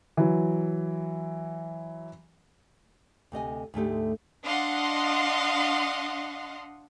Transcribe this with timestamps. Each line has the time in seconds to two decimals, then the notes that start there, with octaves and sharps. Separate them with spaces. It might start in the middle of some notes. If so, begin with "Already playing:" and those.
0.17 E3 F#3
3.32 D2 C3 D#5 G#5
3.74 D2 G#2 A3 G4
4.43 D4 D#5 F5 F#5 C6